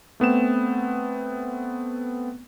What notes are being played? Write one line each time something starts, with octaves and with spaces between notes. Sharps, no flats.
A3 B3 C4 E7